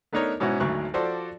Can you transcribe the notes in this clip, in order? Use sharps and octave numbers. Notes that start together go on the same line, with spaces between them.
A3 B3 D4 D#4 A#4 C#5
G#2 B2 C#4 E4 F#4
G#1 D2 F#3 C#6 F#6
F3 F#4 A4 C5 D5